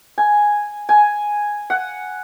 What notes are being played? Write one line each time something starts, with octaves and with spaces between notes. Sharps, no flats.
G#5
G#5
F#5